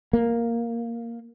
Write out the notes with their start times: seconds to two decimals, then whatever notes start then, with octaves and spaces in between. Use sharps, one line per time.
0.13 A#3